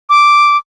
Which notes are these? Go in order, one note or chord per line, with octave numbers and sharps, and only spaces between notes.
D6